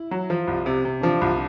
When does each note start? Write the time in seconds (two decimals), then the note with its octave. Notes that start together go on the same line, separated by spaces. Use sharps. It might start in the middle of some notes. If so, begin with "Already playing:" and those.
Already playing: E4
0.11 F#3
0.30 F3
0.47 C2
0.66 C3
0.85 C3
1.02 F3 D4
1.21 C2